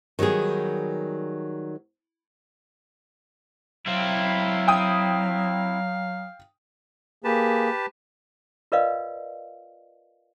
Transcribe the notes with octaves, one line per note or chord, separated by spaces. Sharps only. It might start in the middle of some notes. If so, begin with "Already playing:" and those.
D#3 F#3 G3 B3 G#4
F#3 C4 E4 F5
G5 D#6
A#3 G4 G#4 B4 A5
F4 A#4 B4 D5 D#5 F5